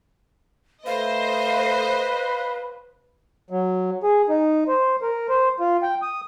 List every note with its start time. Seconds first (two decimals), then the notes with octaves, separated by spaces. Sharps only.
0.86 A3 B4 C5 D#5 F5
3.50 F#3
4.03 G#4
4.29 D#4
4.68 C5
5.02 A#4
5.29 C5
5.60 F4
5.83 G5
6.02 D#6